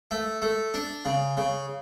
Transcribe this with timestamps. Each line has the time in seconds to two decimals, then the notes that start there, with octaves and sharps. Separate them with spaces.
0.11 A3
0.42 A3
0.74 D4
1.05 C#3
1.37 C#3